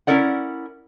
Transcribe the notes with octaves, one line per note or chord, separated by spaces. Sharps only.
C#4 E4 A#4 D5 F#5